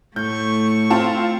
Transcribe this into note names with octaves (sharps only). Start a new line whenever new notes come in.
A2 A3 C#6 G6
C4 F4 A5